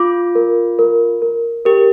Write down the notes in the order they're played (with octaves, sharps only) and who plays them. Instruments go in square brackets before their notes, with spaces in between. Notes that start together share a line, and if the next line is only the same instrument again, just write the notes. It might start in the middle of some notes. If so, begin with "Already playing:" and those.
Already playing: [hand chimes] F4 [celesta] D6
[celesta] A#4
A#4
A#4
[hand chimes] G4 [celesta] A#4